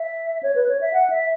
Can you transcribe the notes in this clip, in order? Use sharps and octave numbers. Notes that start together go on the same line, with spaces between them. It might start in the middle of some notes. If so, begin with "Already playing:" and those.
Already playing: E5
C#5
B4
C#5
E5
F#5
E5